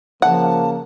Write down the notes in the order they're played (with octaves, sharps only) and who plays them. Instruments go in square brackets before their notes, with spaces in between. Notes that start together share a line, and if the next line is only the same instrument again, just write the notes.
[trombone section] C#3 A#3 [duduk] F3 [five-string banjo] F#5 [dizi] A5